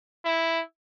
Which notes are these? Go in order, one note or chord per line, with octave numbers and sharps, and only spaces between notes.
E4